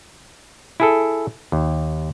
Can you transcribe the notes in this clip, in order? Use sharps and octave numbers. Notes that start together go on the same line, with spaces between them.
E4 G#4 A4
D#2